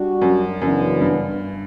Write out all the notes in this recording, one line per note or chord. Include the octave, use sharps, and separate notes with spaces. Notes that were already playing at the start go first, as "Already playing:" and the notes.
Already playing: G3 D4 F#4
F#2
F#2 C#3 E3 B3 D4 F#4
G2